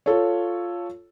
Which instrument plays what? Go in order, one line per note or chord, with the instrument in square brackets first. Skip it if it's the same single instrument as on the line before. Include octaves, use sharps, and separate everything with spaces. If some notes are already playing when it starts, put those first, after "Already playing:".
[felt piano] F4 A4 C#5